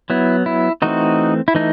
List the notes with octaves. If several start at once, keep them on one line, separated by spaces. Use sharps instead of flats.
F#3 B3 E4
E4
E3 A3 C4 D#4 F#4
E4
E3 A3 D#4